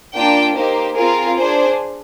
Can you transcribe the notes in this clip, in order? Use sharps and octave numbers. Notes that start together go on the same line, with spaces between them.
A#3 D4 F4 G5
A#3 D#4 G4 C5
C4 F4 G#4 A#4
D4 G#4 C5